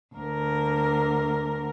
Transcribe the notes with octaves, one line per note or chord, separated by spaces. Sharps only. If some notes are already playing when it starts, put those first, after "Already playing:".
D2 A#4